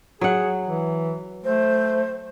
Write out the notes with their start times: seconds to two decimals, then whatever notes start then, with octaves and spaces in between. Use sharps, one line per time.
0.21 F#3 G#4 F#5
0.66 E3
1.44 A3 C5